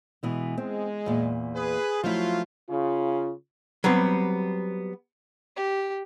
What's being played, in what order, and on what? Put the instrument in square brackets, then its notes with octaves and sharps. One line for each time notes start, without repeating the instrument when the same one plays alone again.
[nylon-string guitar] B2 E3 G#3
[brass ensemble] G#3 [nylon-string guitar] C4
[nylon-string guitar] E2 A#2
[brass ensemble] G#4 B4
[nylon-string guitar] F3 A3 E4 [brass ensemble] F#3 F4
[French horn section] C#3 F4
[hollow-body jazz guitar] F#3 G3 B3 C4
[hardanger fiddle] G4